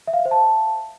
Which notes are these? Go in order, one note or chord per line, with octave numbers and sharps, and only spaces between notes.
E5
F5
E5
C5
A5